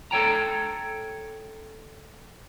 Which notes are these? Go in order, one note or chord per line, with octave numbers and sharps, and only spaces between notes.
A4 C#5 G5 A#5